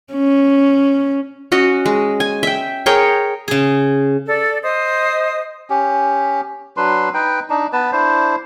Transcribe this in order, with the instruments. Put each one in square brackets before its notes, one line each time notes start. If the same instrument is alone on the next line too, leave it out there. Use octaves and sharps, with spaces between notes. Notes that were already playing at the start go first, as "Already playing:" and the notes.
[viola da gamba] C#4
[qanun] C#4 F#4 D#5
G#3
G#5
E5 G5
G#4 A#4 C#5 G5
[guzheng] C#3 G#4
[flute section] A4 D5
C5 D#5 D#6
[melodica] C#4 G4
F#3 D4 B4 C6
D#4 B4 G5
D4 D#4
B3 B4 A5
D4 E4 C5